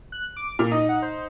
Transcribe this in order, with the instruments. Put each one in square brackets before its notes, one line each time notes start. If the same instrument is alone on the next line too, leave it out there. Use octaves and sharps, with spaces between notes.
[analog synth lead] F#6
D6
[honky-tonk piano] A#2 [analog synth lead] F6
[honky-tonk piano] D#4 [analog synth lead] D#5
[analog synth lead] F#5
C5